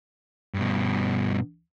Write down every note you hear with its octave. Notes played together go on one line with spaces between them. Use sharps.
G2 B2